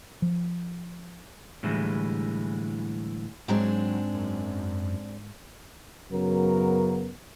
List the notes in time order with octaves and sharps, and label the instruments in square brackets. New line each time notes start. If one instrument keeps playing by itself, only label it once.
[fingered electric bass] F3
[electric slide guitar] A2 D3 E3 G3 G#3
[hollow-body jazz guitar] G#2 G5 A#5 [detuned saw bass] F#3 [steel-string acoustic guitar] G#3 C4 D4
[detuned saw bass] F#2
[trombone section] F#2 C#3 F#3 B3 A#4